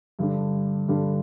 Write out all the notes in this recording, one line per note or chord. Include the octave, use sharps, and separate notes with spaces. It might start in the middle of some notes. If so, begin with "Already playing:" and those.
G2 D3 G3 D4
G2 D3 G3 D4